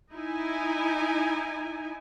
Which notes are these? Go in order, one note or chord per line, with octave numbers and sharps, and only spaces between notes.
D#4 E4 G#5